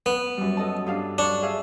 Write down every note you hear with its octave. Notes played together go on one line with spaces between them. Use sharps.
B3
F#2 G3
A4 D#5 A5
G2 D4 F5
D4 C#5 A5 C#6
G#4 E5 F5